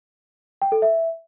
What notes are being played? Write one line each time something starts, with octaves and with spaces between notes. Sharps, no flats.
G5
A4
E5